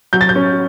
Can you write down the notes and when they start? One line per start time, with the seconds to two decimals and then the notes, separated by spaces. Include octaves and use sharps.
0.13 F#3 G6
0.21 A6
0.29 G6
0.36 C#4